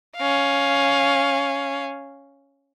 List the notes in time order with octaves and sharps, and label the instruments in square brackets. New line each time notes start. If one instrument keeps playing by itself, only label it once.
[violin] C#4 F5